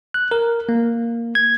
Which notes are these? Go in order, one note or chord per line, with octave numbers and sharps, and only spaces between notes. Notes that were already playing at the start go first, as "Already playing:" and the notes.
F#6
A#4
A#3
G#6